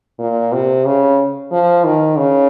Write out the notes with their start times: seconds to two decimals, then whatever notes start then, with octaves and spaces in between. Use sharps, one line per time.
0.19 A#2
0.53 C3
0.86 C#3
1.51 F3
1.85 D#3
2.18 C#3